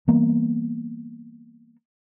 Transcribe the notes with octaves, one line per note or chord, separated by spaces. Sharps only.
E3 G3 A#3 B3